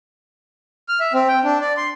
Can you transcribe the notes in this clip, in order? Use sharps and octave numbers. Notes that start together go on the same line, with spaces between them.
F6
E5
C4
G5
D4
D5
C6